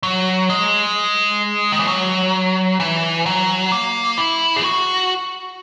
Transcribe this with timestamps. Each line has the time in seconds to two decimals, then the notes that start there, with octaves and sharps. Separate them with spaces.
0.03 F#3
0.50 G#3
1.72 D#3
1.80 E3
1.88 F#3
2.80 E3
3.26 F#3
3.72 A#3
4.18 E4
4.56 G#4
4.64 F#4